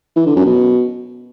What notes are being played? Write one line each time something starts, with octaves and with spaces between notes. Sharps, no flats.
E3
D3
F#2
B2